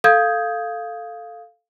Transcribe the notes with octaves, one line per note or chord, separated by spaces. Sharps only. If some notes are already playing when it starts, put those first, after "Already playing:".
A4 F5 D#6 G6 G#6